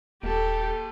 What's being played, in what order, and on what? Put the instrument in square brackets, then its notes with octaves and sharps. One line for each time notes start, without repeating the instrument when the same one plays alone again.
[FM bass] D#1 [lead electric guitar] A#3 A5 [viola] G4 A4